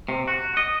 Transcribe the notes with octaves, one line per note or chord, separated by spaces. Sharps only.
C3
F#4
D#5